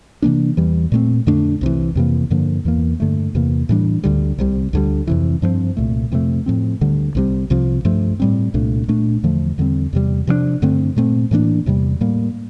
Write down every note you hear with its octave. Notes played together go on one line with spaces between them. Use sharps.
C3 E3 A#3 D4
E2 E3 G3
A#2 A3 C4
F2 D3 A3 D4
C2 C3 E3
F2 C3 E3 A#3
G2 D3 F3 A#3
E2 E3 A#3
G2 D3 A3
E2 C3 E3 A#3
A2 E3 G3 D4
D2 D3 G3
C2 C3 G3
D2 D3 G3
F2 C3 E3
G2 F3 A3 C4
C2 A#2 A3
F2 C3 E3 A3
A2 F3 C4
D2 D3 G3
C2 C3 G3
C2 C3 F3
G2 F3 A3
A2 G3 C4
C2 A#2 A3 D4
A#2 A3 D4
E2 D3 F3 A3
E2 D3 G3 C4
E2 C3 G3
C3 F3 A#3 D4
G2 D3 A3 C4
A#2 A3 C4
A2 E3 A#3 D4
E2 C3 G3
A2 G3 A#3